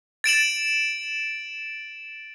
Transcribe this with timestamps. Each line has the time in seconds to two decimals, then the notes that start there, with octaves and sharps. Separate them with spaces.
0.24 A6 D7 E7 F#7